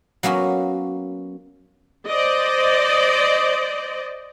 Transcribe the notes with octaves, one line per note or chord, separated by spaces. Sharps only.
F#3 A#3 B3 C#4 F#4
C5 D5 D#5